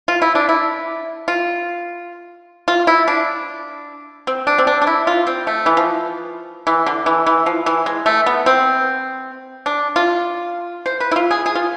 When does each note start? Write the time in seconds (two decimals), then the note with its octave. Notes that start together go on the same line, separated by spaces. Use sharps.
0.08 F4
0.22 E4
0.35 D4
0.49 E4
1.28 F4
2.68 F4
2.87 E4
3.08 D4
4.27 C4
4.47 D4
4.58 C4
4.67 D4
4.82 D4
4.87 E4
5.07 F4
5.27 C4
5.47 A3
5.66 E3
5.77 F3
6.67 E3
6.86 D3
7.06 E3
7.27 E3
7.46 F3
7.66 E3
7.86 G#3
8.06 A3
8.26 B3
8.46 C4
9.66 D4
9.96 F4
10.86 C5
11.00 B4
11.11 E4
11.16 F4
11.31 G#4
11.46 G#4
11.55 F4